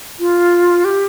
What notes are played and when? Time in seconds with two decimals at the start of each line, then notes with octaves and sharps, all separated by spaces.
0.20 F4
0.85 G4